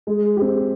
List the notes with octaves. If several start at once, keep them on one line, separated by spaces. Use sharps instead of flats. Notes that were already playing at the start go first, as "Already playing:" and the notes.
G#3
C4 G4